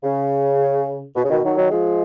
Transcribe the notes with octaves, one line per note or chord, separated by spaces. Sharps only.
C#3
B2
C#3
B2 D#3
D#3 F#3
D#3 F#3
F3 G#3